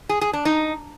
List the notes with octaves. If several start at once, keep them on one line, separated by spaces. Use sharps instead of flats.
G#4
G#4
D4
D#4